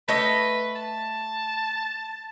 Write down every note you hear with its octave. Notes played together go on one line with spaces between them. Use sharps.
A3 B4 D#5
A5